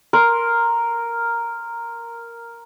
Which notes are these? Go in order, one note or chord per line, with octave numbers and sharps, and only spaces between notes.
A#4 C6